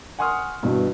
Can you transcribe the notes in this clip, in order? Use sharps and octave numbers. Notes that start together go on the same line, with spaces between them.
F#5 G#5 C6 C#6 D#6 F6
G2 B2 E3